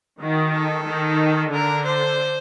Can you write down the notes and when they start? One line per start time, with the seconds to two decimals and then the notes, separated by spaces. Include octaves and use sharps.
0.21 D#3 F#4
0.54 A4
0.86 D#3
1.52 D3 A#4
1.85 C5